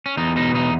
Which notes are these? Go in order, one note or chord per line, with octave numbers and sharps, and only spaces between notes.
C#4
E2 D#4
B2 D#4
E2 D#4